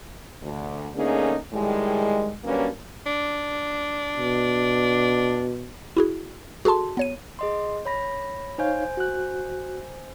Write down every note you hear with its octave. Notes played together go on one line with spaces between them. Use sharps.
D2
D3 A3 A#3 C#4 D#4 G#4
A2 D#3 G3 G#3
F#3 G3 A#3 C#4 D4 B4
D4
B2
E4 F#4 G#4
F#4 G#4 A4 A5 C6
B3 C#5 D#7
G#4 D#5 C6
C#5 B5 A#6
D#4 C5 C#5 F5 G#5 G6
F#4 F#6